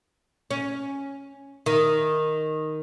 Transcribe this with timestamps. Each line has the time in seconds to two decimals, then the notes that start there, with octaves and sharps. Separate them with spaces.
0.51 C#4
1.66 D#3